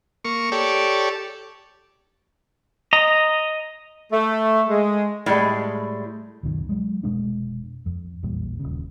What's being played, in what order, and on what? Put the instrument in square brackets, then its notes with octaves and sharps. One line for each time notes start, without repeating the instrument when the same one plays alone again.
[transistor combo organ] A#3 C#6
G4 A4 C#5 D5
[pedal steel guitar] D#5 A#5
[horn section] A3
G#3
[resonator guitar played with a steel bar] A2 G3 G#3
[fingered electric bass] C#2 F#2 B2 D#3
F#3 G#3
F1 B2 G#3 D4
F2
A#1 E2 A#2 G3
D#1 G#1 C#3